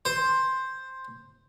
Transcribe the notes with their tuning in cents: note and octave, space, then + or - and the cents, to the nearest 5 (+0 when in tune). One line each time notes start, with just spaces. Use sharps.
C5 +5